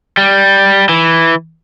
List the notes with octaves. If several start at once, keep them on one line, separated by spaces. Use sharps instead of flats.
G3
E3